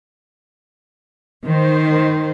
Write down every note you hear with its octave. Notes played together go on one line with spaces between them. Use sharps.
D#3 C5